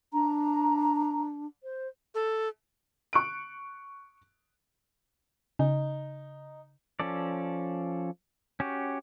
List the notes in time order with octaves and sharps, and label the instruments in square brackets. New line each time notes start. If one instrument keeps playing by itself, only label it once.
[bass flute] D4 [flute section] A#5
[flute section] C5
[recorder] A4
[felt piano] C#6 F#6 D7
[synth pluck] C#3 [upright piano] D#4
[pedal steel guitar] F3 C#4 A4 D5
C#4 F#4 G4